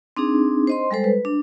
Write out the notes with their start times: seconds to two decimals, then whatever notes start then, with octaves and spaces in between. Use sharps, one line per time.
0.17 C4 D4 D#4 G#4
0.67 C5 D#5 C6
0.91 G3 G#3 A4 C5
1.04 B4
1.25 D4